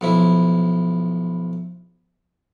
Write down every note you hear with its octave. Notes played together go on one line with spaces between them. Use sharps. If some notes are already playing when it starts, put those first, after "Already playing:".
B1 F3 E4